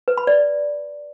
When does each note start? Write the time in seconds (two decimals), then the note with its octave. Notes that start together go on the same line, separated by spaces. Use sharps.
0.08 B4
0.17 B5
0.27 D5